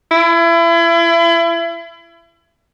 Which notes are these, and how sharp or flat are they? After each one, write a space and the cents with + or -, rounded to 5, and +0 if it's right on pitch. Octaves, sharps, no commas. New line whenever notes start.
E4 +30